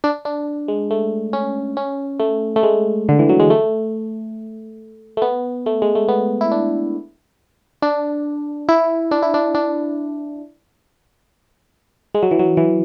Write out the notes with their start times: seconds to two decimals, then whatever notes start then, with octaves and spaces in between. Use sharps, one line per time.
0.04 D4
0.25 D4
0.68 G#3
0.91 A3
1.33 C#4
1.77 C#4
2.20 A3
2.56 A3
2.63 G#3
3.09 D3
3.19 E3
3.29 F#3
3.40 G#3
3.50 A3
5.17 A3
5.22 B3
5.66 A3
5.82 G#3
5.95 A3
6.08 B3
6.41 E4
6.52 D4
7.82 D4
8.69 E4
9.11 D4
9.22 E4
9.34 D4
9.55 D4
12.15 G#3
12.23 F#3
12.31 E3
12.39 F#3
12.57 E3